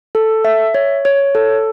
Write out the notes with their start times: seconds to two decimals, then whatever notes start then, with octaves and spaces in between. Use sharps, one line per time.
0.15 A4
0.45 E5
0.75 C#5
1.05 C#5
1.35 A4